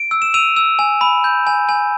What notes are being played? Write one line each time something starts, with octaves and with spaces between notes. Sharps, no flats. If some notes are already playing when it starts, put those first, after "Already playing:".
Already playing: D7
E6
E7
E6 D#7 F7
E6
G#5
B5
G6
G#5
G#5